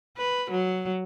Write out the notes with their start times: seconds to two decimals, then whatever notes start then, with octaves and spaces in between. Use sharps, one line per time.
0.17 B4
0.51 F#3